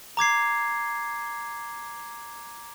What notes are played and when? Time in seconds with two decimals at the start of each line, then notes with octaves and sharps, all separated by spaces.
0.17 A#5 D6 G#6 C7